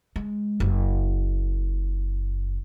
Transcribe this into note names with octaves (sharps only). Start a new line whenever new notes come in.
G#3
F#1